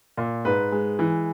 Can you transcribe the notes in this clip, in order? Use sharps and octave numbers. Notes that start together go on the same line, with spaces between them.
A#2
G#2 B4
G#3
E3